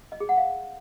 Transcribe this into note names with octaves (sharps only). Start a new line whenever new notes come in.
D#5
G#4
F#5
F5